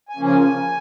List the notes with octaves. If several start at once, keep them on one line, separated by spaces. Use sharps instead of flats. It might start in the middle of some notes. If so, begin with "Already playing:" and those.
G#5
C#3 F3 A#3 C#4
G#5